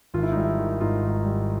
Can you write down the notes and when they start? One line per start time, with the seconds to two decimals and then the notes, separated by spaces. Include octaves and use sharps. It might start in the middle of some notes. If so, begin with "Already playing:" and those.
0.14 G#1 F4
0.23 E4
0.32 D#4
0.36 G3 E4
0.58 D#3
0.80 G#2 D#4 F4
1.03 G#1
1.25 G3